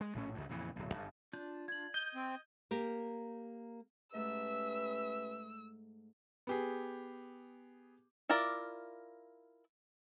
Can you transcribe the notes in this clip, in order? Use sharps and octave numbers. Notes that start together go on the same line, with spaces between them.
G#3
A#1 A2 C#4
C#2 G2
F2 A#2 C#3 E3
D1 B1
G1 G2
D4 F4 G6
D4 F4 G#6 F#7
D#5 G6
C4
A#3 G4 A#4
G#2 A3 C#4 G4 B4 E5 E6
B3 G4 G#4
E4 F4 A#4 D5